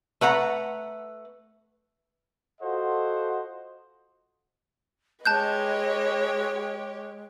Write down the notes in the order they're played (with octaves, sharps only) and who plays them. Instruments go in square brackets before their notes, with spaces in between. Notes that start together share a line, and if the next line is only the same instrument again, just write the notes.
[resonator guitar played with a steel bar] A3 B4 F#5 A#5
[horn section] F4 F#4 A4 C5 D#5 F#5
[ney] G#3 [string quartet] G4 C#5 [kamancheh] B4 D#5 [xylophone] A5 F#6 G6